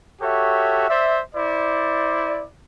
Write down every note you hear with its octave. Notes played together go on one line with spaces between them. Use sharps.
F#4 G4 A4 C#5 E5
C5 D5 E5
E4 C5 D5